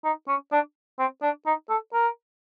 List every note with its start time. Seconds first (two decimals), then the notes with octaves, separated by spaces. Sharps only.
0.05 D#4
0.28 C#4
0.52 D4
0.99 C4
1.23 D4
1.46 D#4
1.70 A4
1.94 A#4